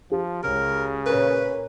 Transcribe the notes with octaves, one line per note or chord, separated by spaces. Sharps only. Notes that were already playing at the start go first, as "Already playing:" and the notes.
F3 G4
C#2 C#3 A#4
A#2 C#4 A#4 B4